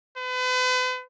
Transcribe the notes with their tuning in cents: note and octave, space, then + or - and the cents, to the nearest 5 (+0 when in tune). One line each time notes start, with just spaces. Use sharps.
B4 +40